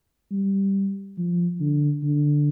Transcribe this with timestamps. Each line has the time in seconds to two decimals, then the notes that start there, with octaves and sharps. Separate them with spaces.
0.32 G3
1.17 F3
1.60 D3
2.03 D3